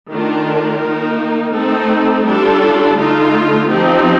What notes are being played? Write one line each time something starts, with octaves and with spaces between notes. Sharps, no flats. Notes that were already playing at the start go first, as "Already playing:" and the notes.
D#3 A3 D4 F4 A#4
D#3 A#3 D#4
A3 C4 D#4 A4
G3 D4 F4 A4
D3 A3 D#4 F4
F3 C4 D#4 G4